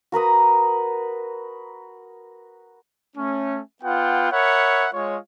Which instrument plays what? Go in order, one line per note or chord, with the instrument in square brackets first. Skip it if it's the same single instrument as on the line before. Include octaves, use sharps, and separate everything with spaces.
[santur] F#4 A#4 B4 D#6
[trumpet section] A3 C#4
B3 F4 B4 F#5 G5
A#4 C#5 E5 F#5 B5
G#3 F4 C#5